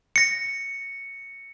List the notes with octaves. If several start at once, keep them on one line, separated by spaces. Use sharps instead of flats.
A#6 C#7